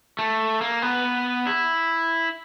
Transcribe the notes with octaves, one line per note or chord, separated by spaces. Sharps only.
A3
A#3
B3
E4